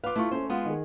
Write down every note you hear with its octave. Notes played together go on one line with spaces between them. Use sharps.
F4 B4 F5 D6
A3 E4 F4 C#6
A3 C#4 C5
G#3 B3 F4
D#3 G#4